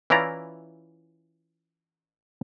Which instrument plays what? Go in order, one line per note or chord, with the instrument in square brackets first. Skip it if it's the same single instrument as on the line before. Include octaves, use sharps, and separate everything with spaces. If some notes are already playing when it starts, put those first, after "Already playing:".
[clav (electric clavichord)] E3 C#4 E4 F4 D5 A#5